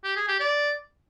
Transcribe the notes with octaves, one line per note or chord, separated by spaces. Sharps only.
G4
G#4
G4
D5